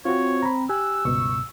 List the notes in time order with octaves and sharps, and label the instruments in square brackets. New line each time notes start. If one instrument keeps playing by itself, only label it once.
[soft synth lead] C4 [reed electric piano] F4 F#4 [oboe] C#5
[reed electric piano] A#5 B5
[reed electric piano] G4 G#5 [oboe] E6 [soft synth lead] F#6
[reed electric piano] C#2 G2 B2 [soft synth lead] C#6